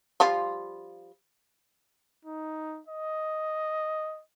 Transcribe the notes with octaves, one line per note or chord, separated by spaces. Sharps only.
F3 G3 F4
D#4
D#5